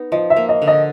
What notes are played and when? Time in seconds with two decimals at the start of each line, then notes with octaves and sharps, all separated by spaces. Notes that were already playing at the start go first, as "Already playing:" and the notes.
Already playing: B3 D#4
0.12 F3 D#5
0.30 E5
0.37 A#3
0.49 D#5
0.62 D3
0.68 D#5